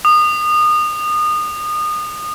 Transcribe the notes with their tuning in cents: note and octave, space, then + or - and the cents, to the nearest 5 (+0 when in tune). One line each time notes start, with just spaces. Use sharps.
D#6 -30